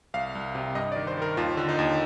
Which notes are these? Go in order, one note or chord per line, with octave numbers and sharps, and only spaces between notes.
C2 F5
C2
C3
G2 D#5
D5
D#3
C5
D#3 A#4
D#2 F4
D3
D#4
D#2